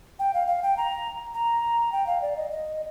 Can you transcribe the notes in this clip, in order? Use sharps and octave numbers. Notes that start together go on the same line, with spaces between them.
G5
F5
F5
G5
A#5
A#5
G5
F5
D5
D#5
D#5